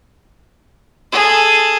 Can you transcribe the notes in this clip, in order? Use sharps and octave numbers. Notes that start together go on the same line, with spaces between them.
G#4 A4